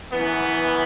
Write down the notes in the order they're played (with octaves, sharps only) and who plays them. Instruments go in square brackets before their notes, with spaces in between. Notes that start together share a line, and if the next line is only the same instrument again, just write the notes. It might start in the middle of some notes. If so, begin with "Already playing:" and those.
[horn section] F#2 E3 B3